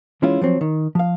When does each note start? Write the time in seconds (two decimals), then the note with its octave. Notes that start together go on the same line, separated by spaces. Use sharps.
0.22 E3 G#3 C#4 E4 F4
0.41 F3 F#3 C4
0.61 D#3
0.95 F3 F5